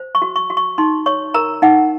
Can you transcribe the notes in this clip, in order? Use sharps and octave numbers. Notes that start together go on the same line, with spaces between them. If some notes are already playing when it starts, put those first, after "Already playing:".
Already playing: C5
C#6
F#4
C#6
F#4
C#6
D#4 C6
C#5 C#6
A#4 A#5
D#4 F#5